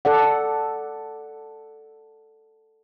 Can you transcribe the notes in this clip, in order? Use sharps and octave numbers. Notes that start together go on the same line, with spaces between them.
A4 D5 F#5